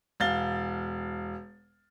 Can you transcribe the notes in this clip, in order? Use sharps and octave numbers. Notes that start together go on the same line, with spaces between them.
E1 F5 A6 G7